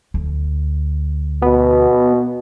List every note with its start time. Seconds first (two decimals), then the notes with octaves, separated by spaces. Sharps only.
0.14 D2
1.42 B2 B3